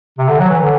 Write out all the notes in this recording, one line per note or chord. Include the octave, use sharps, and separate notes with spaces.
C3
D3
F#3
E3
D3